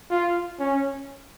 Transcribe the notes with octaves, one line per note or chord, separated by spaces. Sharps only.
F4
C#4